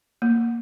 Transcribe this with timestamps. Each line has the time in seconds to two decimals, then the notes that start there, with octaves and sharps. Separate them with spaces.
0.22 A#3